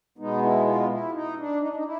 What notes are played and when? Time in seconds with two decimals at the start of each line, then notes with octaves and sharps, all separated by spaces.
0.18 B2 G#3 B3 D#4
0.42 E4
0.66 F4
0.90 E4
1.13 D#4
1.37 D4
1.61 D#4
1.68 D4
1.76 D#4
1.84 E4